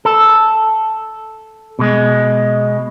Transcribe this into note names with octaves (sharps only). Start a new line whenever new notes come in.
A4
B2 G#3